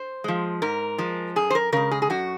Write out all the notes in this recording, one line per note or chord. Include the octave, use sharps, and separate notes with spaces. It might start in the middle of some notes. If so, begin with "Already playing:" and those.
Already playing: C5
F3 G#3
G#2 A#4
F3 G#3
F#2 G#4
C5
A#4
C#3 G#3 A#4
G#4
G#4
F#2 F#4